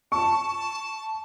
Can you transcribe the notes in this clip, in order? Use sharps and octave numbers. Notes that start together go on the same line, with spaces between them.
A5 C#6